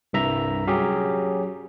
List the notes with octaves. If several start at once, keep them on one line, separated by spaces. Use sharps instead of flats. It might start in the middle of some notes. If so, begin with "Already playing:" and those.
C2 G2 E5 A#5
F#3 C#4 G4 G#4